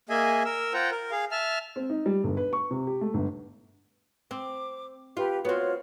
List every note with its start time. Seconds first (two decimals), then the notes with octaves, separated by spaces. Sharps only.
0.09 A#3 G#4 D#5 E5 G#5
0.45 A#4 E6
0.74 F4 C5 F#5 G5 A#5
0.91 A#4
1.11 G#4 F5
1.31 E5 A5 F6
1.76 C4
1.90 D#4
2.06 G3
2.24 G1
2.37 B4
2.53 C#6
2.71 C3
2.87 G4
3.01 A3
3.14 G1
4.31 C4 D6
5.17 F4 G4 B4
5.45 B3 C4 F4 F#4 C#5